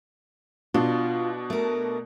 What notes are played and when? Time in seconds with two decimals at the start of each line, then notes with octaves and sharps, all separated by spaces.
0.74 B2 D4 F4
1.50 A3 A#4